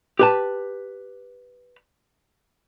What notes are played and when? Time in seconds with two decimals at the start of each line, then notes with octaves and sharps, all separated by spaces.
0.19 G4 B4 A5